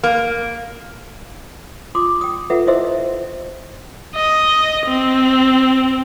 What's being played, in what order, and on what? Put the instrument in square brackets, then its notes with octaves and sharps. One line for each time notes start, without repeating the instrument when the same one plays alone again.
[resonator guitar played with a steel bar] A#3
[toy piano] F4 C6 D6 D#6
G5 D#6
F4 A4 B4 E5 F#5
E4 C5 D#5 E5 C6 E6
E5
[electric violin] D#5
C4